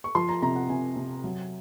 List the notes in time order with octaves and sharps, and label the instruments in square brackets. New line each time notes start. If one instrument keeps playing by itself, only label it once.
[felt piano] C#6
F3 C6
A#5
C3 A#5
F#5
C3 G#5
C3
F#3